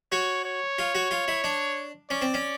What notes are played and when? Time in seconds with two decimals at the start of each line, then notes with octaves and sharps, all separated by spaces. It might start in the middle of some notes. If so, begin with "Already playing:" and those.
0.12 F#4 C#5
0.45 C#5
0.79 F4
0.95 F#4
1.11 F4
1.28 E4
1.44 D4
2.10 C#4 D5
2.22 C4
2.34 C#4